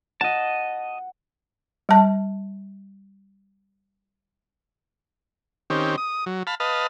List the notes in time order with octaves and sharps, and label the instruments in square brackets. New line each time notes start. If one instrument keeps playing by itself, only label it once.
[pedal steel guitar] D#5 A5 [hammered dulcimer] F#5
[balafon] G3 A5
[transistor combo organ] D#3 C4 C#4 G4
D#6
F#3
F5 A5 B5
B4 D#5 F5 A5